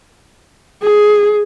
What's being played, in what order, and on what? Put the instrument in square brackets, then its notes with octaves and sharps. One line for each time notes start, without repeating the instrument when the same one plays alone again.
[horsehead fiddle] G#4